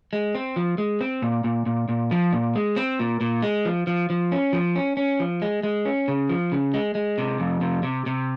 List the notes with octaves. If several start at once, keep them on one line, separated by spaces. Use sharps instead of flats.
G#3
C4
F3
G#3
C4
A#2
A#2
A#2
A#2
F3
A#2
G#3
C4
A#2
A#2
G#3
F3
F3
F3
C#4
F3
C#4
C#4
F3
G#3
G#3
C#4
C#3
F3
C#3
G#3
G#3
C3
F2
C3
C3
C3